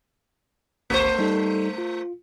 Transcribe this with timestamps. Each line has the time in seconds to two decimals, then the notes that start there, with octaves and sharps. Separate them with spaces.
0.90 G#1 D2 A3 C5 C#6
1.19 G3 D#4 A4
1.78 F4